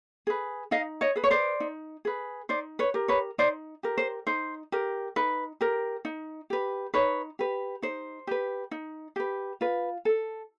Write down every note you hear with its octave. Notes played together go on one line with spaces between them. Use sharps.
G#4 B4
D#4 D#5 F5
C#5 D#5
G#4 B4
C#5
C5 D5
D#4
G#4 B4
D#4 C5 D5
B4 C#5
G4 A#4
B4 C#5
D#4 C5 D5
G4 A#4
C5
D#4 C5
G4 A#4
D#4 B4
G4 A#4
D#4
G4 B4
D#4 B4 C#5
G4 B4
D#4 C5
G4 B4
D#4
G4 B4
F4 B4
A4